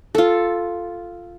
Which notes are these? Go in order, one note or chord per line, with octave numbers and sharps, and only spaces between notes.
F4 A4